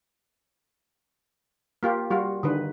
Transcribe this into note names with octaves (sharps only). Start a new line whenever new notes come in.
A#3 F4 G4
G3 F4 F#4
D3 D#3 B4